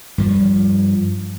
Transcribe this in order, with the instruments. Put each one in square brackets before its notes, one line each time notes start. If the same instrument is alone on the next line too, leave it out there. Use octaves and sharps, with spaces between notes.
[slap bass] G2 F3